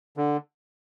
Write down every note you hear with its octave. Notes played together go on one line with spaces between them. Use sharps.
D3